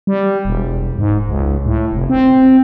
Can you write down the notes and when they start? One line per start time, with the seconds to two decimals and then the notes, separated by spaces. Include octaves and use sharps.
0.07 G3
0.45 E1
0.98 G#2
1.29 C#2
1.66 A2
1.92 F1
2.10 C4